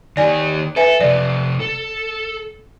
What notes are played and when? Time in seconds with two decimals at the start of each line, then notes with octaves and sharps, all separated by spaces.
0.17 D#3 G4 D5 G#5
0.76 A4 B4 E5 G#5
1.01 C3 F3 D5
1.60 A4